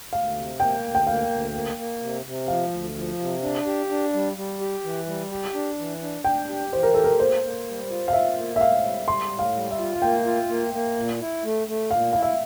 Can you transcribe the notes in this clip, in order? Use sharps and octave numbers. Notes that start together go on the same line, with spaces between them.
D2 F5
C3
A#3 G5
D2
G5
A#3 F5
D2
A#3
A#3
C3
C3
F3 F5
D2
F3
C3
D4
G4
D4
G3
G3
G4
E3
G3
G4
D4
E3
D4
D4 G5
G4
E3 C5
A#4
G4 A4
A#4
A#3 C5
A#3
G3
F4
F5
F4 E5
A#3
E5
A2 F5
G3
G3 C6
A2
F5
G3
E5
F4
F5
A#3 G5
F4
A#3
A#3
A#2
E4
A3
A3
A#2 F5
E4 F5
E5